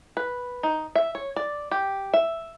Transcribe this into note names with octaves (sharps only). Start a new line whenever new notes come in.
B4
D#4
E5
C#5
D5
G4
E5